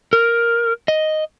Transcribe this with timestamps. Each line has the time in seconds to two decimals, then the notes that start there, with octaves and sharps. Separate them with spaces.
0.13 A#4
0.88 D#5